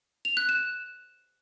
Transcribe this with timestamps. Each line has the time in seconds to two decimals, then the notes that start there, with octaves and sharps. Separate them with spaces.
0.25 F7
0.37 F#6
0.49 E7